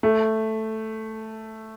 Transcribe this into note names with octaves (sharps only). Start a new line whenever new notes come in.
A3